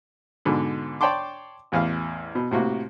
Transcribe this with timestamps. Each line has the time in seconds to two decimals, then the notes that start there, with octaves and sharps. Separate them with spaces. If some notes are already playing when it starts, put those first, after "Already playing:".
0.45 G#2 B2 D3
1.01 C#5 D5 G5 A5 C6 D6
1.72 A1 E2 F5
2.35 B2
2.51 A2 C3 A#3 F#4